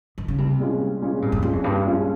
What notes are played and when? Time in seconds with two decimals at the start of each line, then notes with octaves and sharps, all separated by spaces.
0.18 D#3
0.28 C#3
0.38 C2 C3
0.59 A#2 G#3 C#4 F4
0.81 C2
1.01 A#2 G#3 C#4 F4
1.22 C2 A#2
1.32 F2
1.42 G2 A#2 G#3 C#4 F4
1.53 F2
1.64 C2 G2
1.86 A#2 G#3 C#4 F4